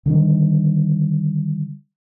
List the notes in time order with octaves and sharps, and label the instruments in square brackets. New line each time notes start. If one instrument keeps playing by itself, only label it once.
[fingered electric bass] D3 D#3 G3